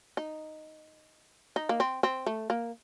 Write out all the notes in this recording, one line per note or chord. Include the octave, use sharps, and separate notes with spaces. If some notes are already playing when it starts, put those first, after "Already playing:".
D#4
D#4
A#3
C4
C4
A3
A#3